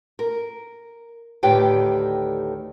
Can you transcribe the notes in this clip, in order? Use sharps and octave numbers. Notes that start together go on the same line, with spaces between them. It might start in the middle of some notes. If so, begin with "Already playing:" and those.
A#4
D2 A2 D#3 G4 B4 G5